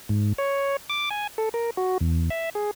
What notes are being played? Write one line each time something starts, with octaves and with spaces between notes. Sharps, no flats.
G#2
C#5
D6
G#5
A4
A#4
F#4
E2
E5
G#4